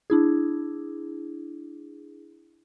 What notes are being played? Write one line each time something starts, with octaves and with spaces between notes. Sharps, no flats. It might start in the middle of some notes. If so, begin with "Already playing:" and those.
D4 E4 G#4